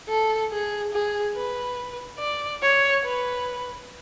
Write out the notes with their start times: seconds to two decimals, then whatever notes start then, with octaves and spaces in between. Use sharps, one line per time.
0.08 A4
0.51 G#4
0.92 G#4
1.35 B4
2.19 D5
2.62 C#5
3.04 B4